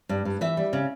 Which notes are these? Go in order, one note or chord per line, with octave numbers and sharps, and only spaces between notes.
G2
G2
E3 E5
G3
C#3